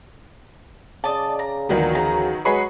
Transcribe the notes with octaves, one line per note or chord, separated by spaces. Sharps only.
C#3 D5 D#5 A5
A#5
D2 A#2 D#3 E3 F#3 B3
C#3 A#5
F#3 G#3 G#4 B4 C#6 C7